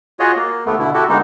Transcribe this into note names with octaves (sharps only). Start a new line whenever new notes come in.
F4 F#4 G#4 C#5 D#5
A#3
D#2 A3 B3
B2 D3 E4
E4 F#4 G4 A4
D3 G#3 A#3 B3 D#4